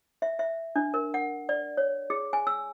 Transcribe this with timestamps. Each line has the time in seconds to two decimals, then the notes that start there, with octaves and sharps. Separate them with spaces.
0.22 E5
0.39 E5
0.76 D4
0.94 A#4
1.14 F#5
1.49 D5
1.77 C#5
2.10 G#4
2.33 G#5
2.47 E6